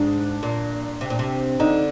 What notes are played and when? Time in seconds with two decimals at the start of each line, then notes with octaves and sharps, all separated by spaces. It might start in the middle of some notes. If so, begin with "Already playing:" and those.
Already playing: G#2 D4
0.43 A#2
1.01 C3
1.10 A#2
1.19 C3
1.60 D3 D#4